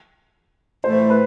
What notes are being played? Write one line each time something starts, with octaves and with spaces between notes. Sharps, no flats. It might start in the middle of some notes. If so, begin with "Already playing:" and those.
A2 E3 A3 C5
B4